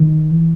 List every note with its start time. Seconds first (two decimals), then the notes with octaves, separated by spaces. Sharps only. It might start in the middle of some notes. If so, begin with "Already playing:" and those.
Already playing: D#3
0.31 E3